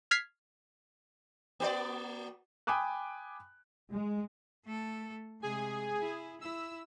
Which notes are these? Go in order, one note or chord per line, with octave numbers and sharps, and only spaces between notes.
F6 G#6 B6 C7
A#3 F#4 D5
G5 G#5 B5 D6 D#6 F#6
G#3
A3 A4
C3 G#3 G#4 G#5
E4
E4 E6